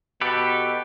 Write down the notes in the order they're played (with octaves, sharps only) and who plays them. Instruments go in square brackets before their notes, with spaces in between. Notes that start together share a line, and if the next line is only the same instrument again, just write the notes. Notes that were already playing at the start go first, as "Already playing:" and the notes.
[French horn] B2 [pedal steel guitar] G4 A4 B4